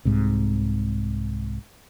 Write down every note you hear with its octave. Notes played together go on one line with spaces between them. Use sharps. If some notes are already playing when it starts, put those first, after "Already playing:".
C2 G#2 C3